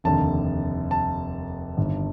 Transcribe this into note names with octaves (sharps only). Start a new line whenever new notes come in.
F1 D#2 D3 A5
A5
G1 G2 D#3